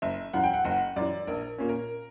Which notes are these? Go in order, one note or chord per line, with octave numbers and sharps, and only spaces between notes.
F#1 E5
F#2 E3 F#5
G5
F#5
F#1 F#5
F#2 E3 D5
A#1 A#4
A#2 A#3 C#4
A#4